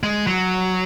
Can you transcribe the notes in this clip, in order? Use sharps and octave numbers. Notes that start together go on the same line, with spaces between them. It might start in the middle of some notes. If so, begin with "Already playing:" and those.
G#3
F#3